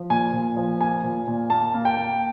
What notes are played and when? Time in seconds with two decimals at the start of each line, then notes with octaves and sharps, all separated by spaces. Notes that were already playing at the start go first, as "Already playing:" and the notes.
Already playing: F3
0.10 A#2 G#5
0.33 A#2
0.57 F3
0.81 A#3 G#5
1.03 A#2
1.28 A#2
1.50 A#3 A5
1.74 A#3
1.85 G5
1.97 A#3